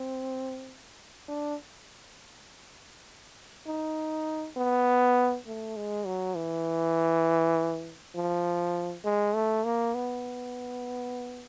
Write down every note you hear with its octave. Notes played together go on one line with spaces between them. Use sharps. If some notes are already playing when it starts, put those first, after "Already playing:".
Already playing: C4
D4
D#4
B3
A3
G#3
F#3
E3
F3
G#3
A3
A#3
B3